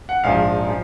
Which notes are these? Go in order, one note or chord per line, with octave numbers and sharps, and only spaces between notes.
F#5
A#1 G#2 F3 F5
F3